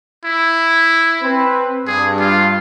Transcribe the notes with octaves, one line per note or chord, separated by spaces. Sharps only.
E4
C4 B4
G2 G#4
F4